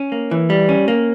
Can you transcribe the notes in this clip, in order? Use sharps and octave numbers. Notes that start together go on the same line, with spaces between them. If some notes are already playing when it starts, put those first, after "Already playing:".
Already playing: C#4
A#3
E3
G3
C#4
A#3